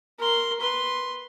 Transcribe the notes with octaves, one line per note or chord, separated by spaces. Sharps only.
A#4 C6
B4 C6